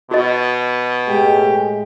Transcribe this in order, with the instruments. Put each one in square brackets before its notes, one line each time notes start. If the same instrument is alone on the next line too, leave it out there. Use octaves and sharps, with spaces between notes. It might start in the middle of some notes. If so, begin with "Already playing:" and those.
[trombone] B2 [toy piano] F#4 D#5
[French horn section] A2 G#3 [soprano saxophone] G4